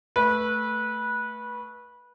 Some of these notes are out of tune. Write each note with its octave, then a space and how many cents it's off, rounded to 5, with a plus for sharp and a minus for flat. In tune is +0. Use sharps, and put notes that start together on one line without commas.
A3 +0 B4 -20